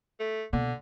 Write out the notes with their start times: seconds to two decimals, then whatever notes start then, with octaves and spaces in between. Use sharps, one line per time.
0.20 A3
0.53 B2 D3